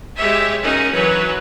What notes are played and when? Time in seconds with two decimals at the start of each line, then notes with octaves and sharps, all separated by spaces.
0.17 G#3 G4 C#5 E5
0.61 C#4 D#4 F#4 G#4 A#4
0.93 E3 F#3 B4 C#5